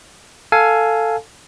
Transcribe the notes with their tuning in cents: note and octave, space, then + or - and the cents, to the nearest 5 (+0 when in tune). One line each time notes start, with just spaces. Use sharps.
A4 +10 F5 +0 G#5 +10